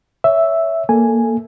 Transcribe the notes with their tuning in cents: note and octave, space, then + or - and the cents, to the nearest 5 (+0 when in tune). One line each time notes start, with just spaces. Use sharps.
C#5 +15 E5 +0
A#3 +0 A4 +0 G#5 +0